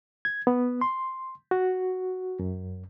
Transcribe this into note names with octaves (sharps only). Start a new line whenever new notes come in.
G#6
B3
C6
F#4
F#2